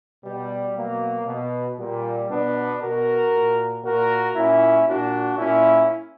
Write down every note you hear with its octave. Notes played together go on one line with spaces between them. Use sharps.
B2 G3
B2 F#3 A#3
B2
A#2 G3
B2 B3 D4
B2 F#4 A#4
A#2
A#2 F#4 A#4
A#2 C#4 E4
A#2 D4 F#4
A#2 C#4 E4